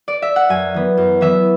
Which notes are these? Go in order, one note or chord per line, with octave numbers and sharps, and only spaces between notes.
D5
E5
F#5
F#2 G#5
E3 B3
F#2
E3 B3 E5